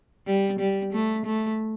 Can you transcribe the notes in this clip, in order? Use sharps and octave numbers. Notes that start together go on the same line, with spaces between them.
G3
G3
A3
A3